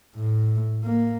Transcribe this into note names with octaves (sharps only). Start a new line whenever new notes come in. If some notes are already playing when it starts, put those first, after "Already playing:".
A2
A#3